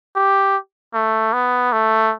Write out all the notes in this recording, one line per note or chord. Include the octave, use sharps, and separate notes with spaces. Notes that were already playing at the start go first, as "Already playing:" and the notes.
G4
A3
B3
A3